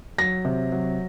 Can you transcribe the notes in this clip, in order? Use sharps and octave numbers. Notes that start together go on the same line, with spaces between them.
F#3 A#6
C3
F#3